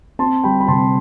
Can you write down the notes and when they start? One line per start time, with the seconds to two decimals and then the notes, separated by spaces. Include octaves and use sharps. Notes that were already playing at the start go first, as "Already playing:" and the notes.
0.19 C4 A5 C6
0.44 G3 G5 B5
0.61 B5
0.68 C3 A5 C6